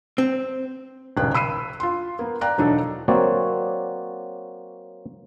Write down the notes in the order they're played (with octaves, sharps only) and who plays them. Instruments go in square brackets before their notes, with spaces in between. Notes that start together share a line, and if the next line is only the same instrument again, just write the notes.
[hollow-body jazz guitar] C4
[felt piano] D#1 B1 C#3 G5 F#6
B5 E6 C7 D#7
F4 C6
A#3 B3
D5 F5 G5 A#5 F#6
E1 F#3 D4 D#4 A4
[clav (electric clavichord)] F#3 A#3 C4 F#4 C#5 D5